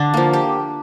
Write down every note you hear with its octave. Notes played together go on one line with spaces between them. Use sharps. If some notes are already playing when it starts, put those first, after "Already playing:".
Already playing: D3 D4
F3 A#3
G4